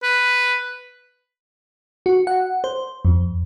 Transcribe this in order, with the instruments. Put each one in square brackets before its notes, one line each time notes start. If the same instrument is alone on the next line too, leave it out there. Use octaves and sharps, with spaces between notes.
[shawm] B4
[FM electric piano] F#4
F#5
C5
F2